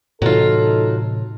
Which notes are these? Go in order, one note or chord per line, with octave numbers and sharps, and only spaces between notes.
A2 C3 E3 F#3 D#4 F4 A4